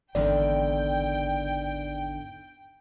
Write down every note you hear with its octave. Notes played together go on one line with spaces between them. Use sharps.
G#1 E2 D3 D#3 D5 G5